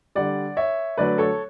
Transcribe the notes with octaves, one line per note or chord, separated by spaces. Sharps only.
D3 G3 D5 F#5
C#5 E5
D3 F#3 A3 B4 D5
A4 C#5